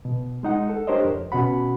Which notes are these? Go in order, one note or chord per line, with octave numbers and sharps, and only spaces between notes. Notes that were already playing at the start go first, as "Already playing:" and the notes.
B2
G#3 D#4 F#5
A4
D4 G4 A#4 C5 C#5 D#5
F2
B2 C#4 F#4 F#5 B5